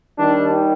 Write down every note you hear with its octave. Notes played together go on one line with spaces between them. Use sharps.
D#2 D#3 G3 D4